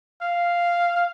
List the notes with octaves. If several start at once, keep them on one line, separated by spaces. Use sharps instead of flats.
F5